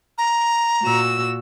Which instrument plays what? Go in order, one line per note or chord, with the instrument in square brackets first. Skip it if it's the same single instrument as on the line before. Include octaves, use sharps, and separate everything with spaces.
[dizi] A#5
[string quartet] A#2 F#4 E6